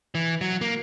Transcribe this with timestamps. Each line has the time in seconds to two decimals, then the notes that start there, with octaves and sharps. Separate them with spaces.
0.15 E3
0.41 F#3
0.61 A#3